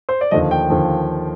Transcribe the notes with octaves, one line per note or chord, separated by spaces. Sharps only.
C5
D5
D#2 D3 F3 D#5
G5
D#2 D3 F3